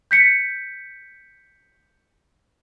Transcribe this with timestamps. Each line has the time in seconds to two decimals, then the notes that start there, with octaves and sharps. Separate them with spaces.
0.11 G6 B6 C#7